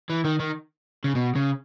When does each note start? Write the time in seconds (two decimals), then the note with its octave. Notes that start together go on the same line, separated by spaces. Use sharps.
0.10 E3
0.25 D#3
0.40 D#3
1.04 C#3
1.15 B2
1.35 C#3